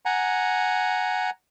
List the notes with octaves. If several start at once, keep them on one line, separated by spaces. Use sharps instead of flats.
F#5 G#5 A#5